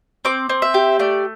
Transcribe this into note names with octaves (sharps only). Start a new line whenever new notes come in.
C4 D6
C4
E5
G4
A3 D5